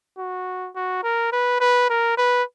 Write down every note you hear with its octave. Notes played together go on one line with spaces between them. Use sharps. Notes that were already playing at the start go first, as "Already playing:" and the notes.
F#4
F#4
A#4
B4
B4
A#4
B4